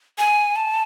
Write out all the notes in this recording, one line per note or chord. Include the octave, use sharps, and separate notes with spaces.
G#5
A5